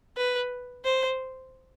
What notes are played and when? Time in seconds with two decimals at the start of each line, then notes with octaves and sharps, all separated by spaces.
0.17 B4
0.85 C5